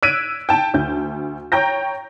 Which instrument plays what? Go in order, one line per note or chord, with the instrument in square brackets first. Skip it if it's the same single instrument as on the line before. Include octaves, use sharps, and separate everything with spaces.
[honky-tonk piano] E6 F#6 G#6 B6 D7 D#7
G5 A5
D2 G6
C#5 G5 A#5 G6 A#6